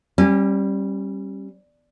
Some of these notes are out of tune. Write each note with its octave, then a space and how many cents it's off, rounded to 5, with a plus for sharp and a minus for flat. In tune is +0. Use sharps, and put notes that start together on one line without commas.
G3 +0 C#4 -35